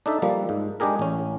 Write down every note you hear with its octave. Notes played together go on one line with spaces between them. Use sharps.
D4 D#4 A4 E5
F3 G3 A#3
G#2
G#3 D4 G4 G#4 A#4
A1 C#4